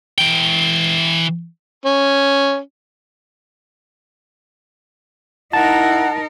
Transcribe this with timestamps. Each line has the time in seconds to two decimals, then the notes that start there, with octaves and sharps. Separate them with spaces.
0.18 E3 G5
1.86 C#4
5.53 D#4 E4 A#4 F#5 A5